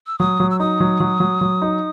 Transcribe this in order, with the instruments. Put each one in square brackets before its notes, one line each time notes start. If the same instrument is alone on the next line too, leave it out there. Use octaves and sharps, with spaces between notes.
[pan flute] E6
[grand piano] F#3 [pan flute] D#6
[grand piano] F#3
[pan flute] E6
[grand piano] D#4 [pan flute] D#6
[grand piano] F#3
F#3
F#3
F#3
D#4